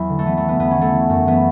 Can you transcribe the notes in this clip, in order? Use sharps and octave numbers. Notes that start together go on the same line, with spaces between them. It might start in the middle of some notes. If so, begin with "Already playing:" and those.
Already playing: E2 F#3 E4
D3
A3
E3 B3
A3
E3
B3
E2 B3
C#4
E3 A3
E3
F#2
E3 B3